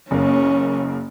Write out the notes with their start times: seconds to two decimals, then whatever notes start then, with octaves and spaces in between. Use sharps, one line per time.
0.11 F#1 A#3 C#4